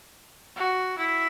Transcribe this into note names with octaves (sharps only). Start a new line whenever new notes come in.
F#4
E4